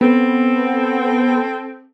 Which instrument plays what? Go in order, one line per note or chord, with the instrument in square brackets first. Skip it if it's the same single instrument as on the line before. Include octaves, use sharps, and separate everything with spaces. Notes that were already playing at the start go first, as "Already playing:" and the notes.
[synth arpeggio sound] B3 [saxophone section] C4 A4